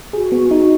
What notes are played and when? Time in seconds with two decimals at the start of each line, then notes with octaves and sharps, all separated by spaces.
0.13 F#4 G#4
0.32 B3
0.50 D#4 F#4